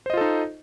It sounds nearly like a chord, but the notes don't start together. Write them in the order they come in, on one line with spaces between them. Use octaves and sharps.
C5 D#5 F4 A4 D#4